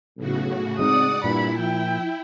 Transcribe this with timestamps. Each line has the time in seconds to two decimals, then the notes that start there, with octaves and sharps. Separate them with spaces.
0.17 B1 A2 C#3 F#4
0.79 G#3 C4 D#4 D5 F#5 D#6
1.24 G2 A#2 E4 B5
1.58 F3 G5